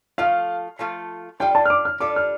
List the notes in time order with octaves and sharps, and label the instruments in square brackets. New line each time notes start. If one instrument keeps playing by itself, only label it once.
[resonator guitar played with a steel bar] F3 A3 F4 A4 [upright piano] F5
[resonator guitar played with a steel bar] F3 A3 F4 A4
[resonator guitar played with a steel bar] G3 D4 F4 A4 [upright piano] G5
[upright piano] A5
F6
D6
F6
[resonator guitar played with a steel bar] G3 D4 F4 A4 [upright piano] D6
[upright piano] F6